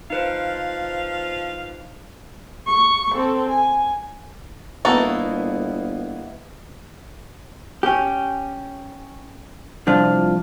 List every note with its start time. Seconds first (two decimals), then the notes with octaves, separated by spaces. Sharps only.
0.10 F3 D#4 B4 C5 F5
2.67 C#6
3.15 C4 A4
3.49 G#5
4.85 G1 A#3 B3 D#4 E4 F#4 A4
7.83 C#4 G4
9.87 C2 F3 D4 F4